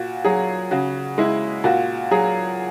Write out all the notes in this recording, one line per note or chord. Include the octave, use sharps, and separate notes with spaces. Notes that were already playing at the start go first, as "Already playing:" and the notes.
Already playing: A#2 F#4
F#3 G#4
C#3 F#4
G#3 E4
A#2 F#4
F#3 G#4